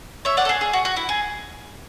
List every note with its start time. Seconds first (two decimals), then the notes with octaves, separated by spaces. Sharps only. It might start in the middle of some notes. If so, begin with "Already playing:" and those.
0.25 C#5 E5
0.37 D5 F#5
0.45 A4
0.49 G#4
0.61 G#4
0.73 F#4
0.85 F#4
0.96 E4
1.09 G#4